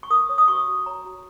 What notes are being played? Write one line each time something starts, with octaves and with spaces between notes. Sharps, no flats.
C#6
A#4 D#6
C#5
D#6
F#4 C#6
F#4
C#5 A#5
F#4